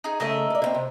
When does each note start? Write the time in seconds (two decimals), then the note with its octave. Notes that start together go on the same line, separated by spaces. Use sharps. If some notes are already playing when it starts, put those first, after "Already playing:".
0.04 D#4 G#4
0.20 C#3 A3 A#4 D#5 E5
0.50 A4 D5
0.62 D3 C4
0.74 C3